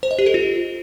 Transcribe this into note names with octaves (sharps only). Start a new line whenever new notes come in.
C5
D#5
G4
A4
F4